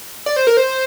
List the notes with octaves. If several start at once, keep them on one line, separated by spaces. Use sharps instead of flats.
D5
C5
A#4
C5